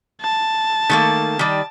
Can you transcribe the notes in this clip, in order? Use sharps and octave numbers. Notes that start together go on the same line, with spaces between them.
A5
D#3 A3 A#3
D#3 G3